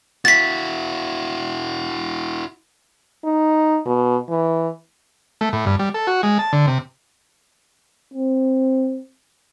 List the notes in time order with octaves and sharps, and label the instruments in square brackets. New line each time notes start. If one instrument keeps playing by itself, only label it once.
[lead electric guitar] E4 F#4 [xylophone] A6 B6
[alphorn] D#4
B2
E3
[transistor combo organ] A3
A2
G2
G3
A4
F#4
G#3
A5
D3
C3
[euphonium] C4